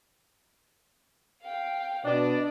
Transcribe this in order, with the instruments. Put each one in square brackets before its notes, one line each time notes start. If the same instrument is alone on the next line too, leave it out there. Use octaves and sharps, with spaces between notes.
[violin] F5 G5
[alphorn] B2 [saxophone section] D4 [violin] D5 D#5